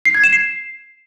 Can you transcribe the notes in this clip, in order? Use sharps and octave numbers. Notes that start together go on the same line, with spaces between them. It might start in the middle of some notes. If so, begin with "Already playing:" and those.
C7
G#6
E7
C7